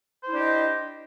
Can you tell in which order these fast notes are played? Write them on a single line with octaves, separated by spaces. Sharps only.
C5 E4 D4 G4 D#5